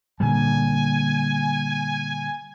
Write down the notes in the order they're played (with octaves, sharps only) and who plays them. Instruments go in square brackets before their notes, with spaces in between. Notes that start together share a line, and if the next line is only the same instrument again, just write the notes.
[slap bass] A#2 D3 G3 [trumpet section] G#5